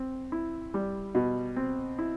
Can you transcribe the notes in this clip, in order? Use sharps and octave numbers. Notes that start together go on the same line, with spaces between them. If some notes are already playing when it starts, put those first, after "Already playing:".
Already playing: C4
E4
G3
B2
C4
E4